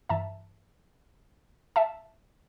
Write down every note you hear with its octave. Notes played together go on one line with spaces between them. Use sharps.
G2 E3 E5 A5
E5 A5